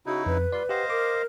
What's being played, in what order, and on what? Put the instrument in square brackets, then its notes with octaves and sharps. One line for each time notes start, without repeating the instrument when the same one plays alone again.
[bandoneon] C#3 D#4 E4 [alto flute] F#4
[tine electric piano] F2 [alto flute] B4
[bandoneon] G3 F4 C6 [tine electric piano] D5
[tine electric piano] G4 F#5 [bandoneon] C5 D#5 F5
[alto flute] A#4 [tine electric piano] D6